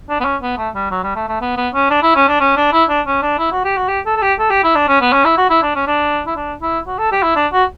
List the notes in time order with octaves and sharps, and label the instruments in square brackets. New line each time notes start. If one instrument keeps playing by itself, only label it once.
[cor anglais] D4
B3
C#4
B3
A3
G3
F#3
G3
A3
A3
B3
B3
C#4
D4
E4
C#4
D4
C#4
D4
E4
D4
C#4
D4
E4
F#4
G4
F#4
G4
A4
A4
G4
A4
G4
E4
D4
C#4
B3
C#4
E4
F#4
E4
D4
C#4
D4
E4
D4
E4
F#4
A4
G4
E4
D4
F#4